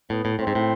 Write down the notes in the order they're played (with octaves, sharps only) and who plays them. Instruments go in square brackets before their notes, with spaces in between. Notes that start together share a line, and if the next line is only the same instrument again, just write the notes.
[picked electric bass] A2 [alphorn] B3
[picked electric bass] A2
[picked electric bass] A2 [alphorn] C4
[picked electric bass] G#2
A2